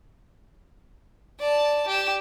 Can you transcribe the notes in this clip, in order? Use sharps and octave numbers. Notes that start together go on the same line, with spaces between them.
D5 A5
G4 E7